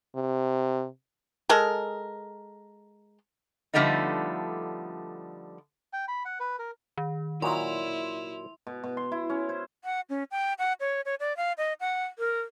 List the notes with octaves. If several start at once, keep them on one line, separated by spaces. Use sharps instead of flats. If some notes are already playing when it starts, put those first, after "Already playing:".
C3
G#3 A4 A#4
D3 F3 G3 A3 B3 D#4
G5
B5
F#5
B4
A#4
D#3
A#2 F#3 D#4 E4 C6 F7
B2
B2
C6
E4
C#4
C5
F#5
C#4
G5
F#5
C#5
C#5
D5
F5
D#5
F#5
A#4